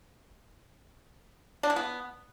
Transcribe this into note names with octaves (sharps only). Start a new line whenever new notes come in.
D4
E3
B3